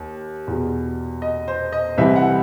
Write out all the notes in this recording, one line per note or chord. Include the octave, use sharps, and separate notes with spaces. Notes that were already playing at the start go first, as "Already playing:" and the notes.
Already playing: D#2
E2 B2
D#5
C5
D#5
C2 C3 E3 E5
F#5